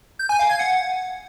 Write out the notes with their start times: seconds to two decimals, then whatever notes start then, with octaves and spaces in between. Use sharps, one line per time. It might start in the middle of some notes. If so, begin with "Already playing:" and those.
0.19 G6
0.29 G#5
0.39 F5
0.49 G#6
0.59 F#5